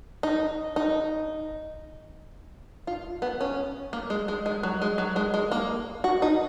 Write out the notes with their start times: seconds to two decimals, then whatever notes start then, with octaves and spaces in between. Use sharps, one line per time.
0.23 D#4
0.76 D#4
2.87 F4
3.22 B3
3.41 C#4
3.93 A#3
4.10 G#3
4.28 G#3
4.46 G#3
4.63 F#3
4.82 G#3
4.98 F#3
5.16 G#3
5.34 G#3
5.52 A#3
6.04 F#4
6.22 D#4